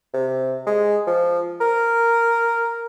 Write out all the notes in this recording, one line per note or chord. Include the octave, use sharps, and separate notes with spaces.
C3
G#3
F3
A#4